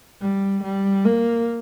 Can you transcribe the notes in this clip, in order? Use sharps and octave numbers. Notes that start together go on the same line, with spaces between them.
G3
G3
A#3